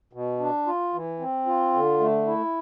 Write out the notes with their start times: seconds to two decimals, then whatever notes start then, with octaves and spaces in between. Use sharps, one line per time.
0.13 B2
0.40 D4
0.66 F4
0.94 E3
1.20 C4
1.46 F4
1.73 D3
2.00 A3
2.27 E4